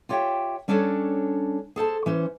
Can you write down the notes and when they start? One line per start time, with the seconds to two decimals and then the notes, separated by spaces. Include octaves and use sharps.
0.09 F4 G4 C#5 D5 E5 G5
0.68 G3 C#4 D4 A4 C#5
1.76 G#4 A4 C5 A5
2.06 E3 C#4 C5